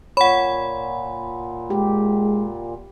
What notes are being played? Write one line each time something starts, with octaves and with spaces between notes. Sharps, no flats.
A#2 C#5 F#5 B5
G#3 G4